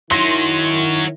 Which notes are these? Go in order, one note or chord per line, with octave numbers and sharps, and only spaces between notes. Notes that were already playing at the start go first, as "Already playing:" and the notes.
D#3 F#3 C#4 E4 C6 A#6